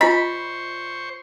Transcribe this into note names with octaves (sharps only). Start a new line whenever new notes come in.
F4 C5 D#5 B5 C#6